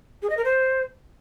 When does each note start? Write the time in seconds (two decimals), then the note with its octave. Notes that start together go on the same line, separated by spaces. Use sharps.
0.22 G#4
0.30 D#5
0.37 A#4
0.45 C5